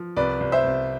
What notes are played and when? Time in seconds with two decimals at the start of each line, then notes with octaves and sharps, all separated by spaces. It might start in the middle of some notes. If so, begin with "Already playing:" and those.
Already playing: F3
0.16 C2 B4 D5
0.40 C2
0.52 C5 E5
0.64 C2